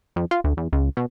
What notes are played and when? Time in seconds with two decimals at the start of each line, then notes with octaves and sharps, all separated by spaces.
0.16 F2
0.31 F4
0.44 D2
0.57 E2
0.73 C#2
0.97 B2